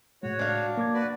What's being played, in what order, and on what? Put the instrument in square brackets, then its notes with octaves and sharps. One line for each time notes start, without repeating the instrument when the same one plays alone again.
[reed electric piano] A2 G#3 [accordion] F#4 C#5
[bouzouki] D4 F5
[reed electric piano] A#3 D6 G#6
[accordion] F#4 B4 D5